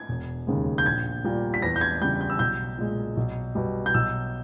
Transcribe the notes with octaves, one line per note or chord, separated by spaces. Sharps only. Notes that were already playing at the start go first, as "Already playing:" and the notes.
Already playing: G#6
E1
D#2 C#3 G#3
G6
A#1 G#6
A#2 G3
B6
E2 A#6
G6
G#6
C#3 G3 G6
G6
E6
B1 G6
A#2 G#3
B1
B2 G3
G6
B1 E6